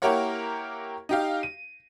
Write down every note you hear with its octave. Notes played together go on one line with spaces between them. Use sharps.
A#3 E4 G4 A#4 C#5 F#5
D#4 G4 F5
D#7